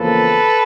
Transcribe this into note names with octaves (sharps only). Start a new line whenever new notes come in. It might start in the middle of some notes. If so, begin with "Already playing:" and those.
Already playing: E2 C#3 F3 A#3 A4 B4